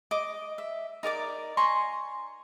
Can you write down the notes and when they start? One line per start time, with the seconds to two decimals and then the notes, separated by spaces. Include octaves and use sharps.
0.11 D#5 D6
0.58 E5
1.03 D#4 A#4 D5 D6
1.57 G#5 A#5 C6 C#6